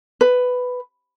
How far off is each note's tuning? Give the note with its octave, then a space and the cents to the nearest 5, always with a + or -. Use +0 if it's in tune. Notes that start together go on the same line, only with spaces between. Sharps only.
B4 +10